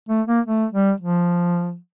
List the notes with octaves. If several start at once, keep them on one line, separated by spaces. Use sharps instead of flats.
A3
A#3
A3
G3
F3